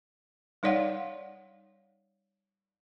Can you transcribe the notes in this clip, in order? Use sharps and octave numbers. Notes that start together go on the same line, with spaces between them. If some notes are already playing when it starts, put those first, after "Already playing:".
G3 D#4 C#5 D5 F5 F#5